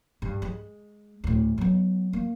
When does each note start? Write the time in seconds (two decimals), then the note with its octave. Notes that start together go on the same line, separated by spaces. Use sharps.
0.22 G2
0.42 G#3
1.24 D2 A2
1.58 F#3 B3
2.13 A#3